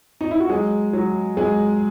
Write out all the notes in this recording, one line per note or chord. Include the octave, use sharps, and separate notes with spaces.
D#4
E4
F#4
F#3 G#3 G#4
F#3
F#3 G#3 G#4